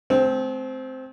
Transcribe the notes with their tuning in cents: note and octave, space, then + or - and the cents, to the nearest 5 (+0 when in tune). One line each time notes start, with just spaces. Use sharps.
A3 -45 C4 -5